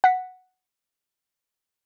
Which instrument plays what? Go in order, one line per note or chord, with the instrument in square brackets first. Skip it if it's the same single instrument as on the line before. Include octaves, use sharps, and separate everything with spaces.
[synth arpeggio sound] F#5 B6